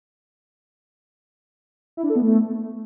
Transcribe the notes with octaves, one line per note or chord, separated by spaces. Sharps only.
E4
D4
A4
B3
A3